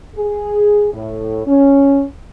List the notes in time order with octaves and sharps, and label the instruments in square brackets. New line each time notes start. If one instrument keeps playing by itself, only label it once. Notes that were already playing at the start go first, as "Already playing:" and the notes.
[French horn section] G#4
A2
C#4